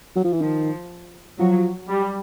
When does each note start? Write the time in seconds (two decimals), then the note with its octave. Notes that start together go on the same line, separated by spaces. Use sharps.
0.16 F#3
0.24 F3
0.33 E3
0.41 D#3 F3
1.39 F3 F#3
1.88 G3